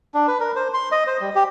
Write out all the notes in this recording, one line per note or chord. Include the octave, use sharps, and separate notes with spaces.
D4
B4
A#4
C5
C6
D#5
C5
G3
G4